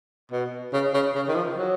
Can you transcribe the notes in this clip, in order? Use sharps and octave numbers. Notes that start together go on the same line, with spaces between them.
B2
C#3
C#3
C#3
D#3
F3
F#3